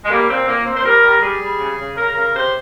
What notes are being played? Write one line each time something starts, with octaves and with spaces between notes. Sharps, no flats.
G#3
G3 A#3
A#2 C4
A#2 A#3
A#2 C4
C5
G3 A#4
G3
G3 G#4
G3
C#3
C#3
C#3 A#4
C#3
C3 C5